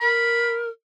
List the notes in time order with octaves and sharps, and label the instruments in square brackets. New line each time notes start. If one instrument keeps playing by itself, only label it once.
[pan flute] A#4 [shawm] B5